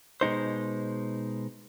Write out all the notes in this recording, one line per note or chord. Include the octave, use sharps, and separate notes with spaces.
B2 G#3 D#4 C5